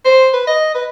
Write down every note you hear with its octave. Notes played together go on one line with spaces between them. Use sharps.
C5
B4
D#5
B4